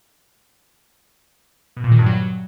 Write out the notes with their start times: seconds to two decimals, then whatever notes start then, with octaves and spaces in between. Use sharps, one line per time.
1.77 B2
1.84 A#2
1.91 D#3
1.99 G2
2.06 F#3